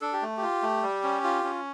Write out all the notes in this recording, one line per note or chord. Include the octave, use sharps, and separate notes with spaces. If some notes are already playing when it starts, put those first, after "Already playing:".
D4 A4
G4
A3
F4 G4
A3
G3
C#4
F4
C#4